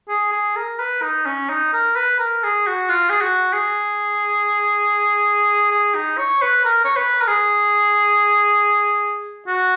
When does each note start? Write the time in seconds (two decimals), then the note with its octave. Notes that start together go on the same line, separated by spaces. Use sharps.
0.09 G#4
0.32 G#4
0.56 A#4
0.79 B4
1.02 D#4
1.26 C#4
1.49 D#4
1.73 A#4
1.96 B4
2.19 A#4
2.43 G#4
2.67 F#4
2.89 F4
3.09 G#4
3.21 F#4
3.53 G#4
5.71 G#4
5.95 D#4
6.18 C#5
6.42 B4
6.65 A#4
6.85 C#5
6.96 B4
7.21 A#4
7.27 G#4
9.47 F#4